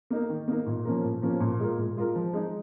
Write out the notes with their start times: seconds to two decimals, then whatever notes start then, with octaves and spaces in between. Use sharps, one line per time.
0.10 A#3 D#4 A#4
0.29 D#3
0.48 A#3 D#4 A#4
0.66 A#2
0.85 F3 A#3 C#4 A#4
1.03 A#2
1.22 F3 A#3 C#4 A#4
1.40 A#2
1.59 G#3 F4 A#4
1.78 A#2
1.97 G#3 F4 A#4
2.15 F3
2.33 G#3 D#4